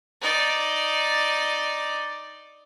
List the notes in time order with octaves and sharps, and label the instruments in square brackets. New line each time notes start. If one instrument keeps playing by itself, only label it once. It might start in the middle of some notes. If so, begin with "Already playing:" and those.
[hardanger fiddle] D#4 D5